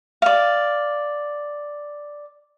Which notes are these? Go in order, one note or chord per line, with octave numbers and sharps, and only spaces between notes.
D5 F5